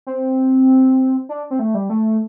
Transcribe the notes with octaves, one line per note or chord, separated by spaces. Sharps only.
C4
D4
C4
A3
G3
A3